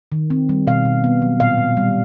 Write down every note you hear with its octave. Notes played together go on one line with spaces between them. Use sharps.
D#3
C4
G3
B2 F5
B2
B3
F#3
A#2 F5
A#2
G3